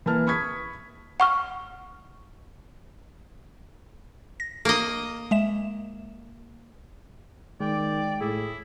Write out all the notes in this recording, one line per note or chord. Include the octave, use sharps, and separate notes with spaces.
E3 A#3 A5 F6
B5 C#6 D#6 G#6 B6
F#5 C#6 F6
A#6
A#3 D#5
G#3 E5 E7
D#3 G#3 D5 G5
A2 E4 G#4